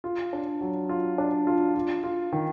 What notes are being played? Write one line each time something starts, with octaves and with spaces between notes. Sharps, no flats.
F4
D4
F#3
F4
D4
F4
F4
F4
D#3